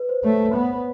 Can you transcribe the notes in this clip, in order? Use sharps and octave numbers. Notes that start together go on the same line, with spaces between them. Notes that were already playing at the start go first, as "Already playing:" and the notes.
Already playing: B4
C5
A3 C#5
B3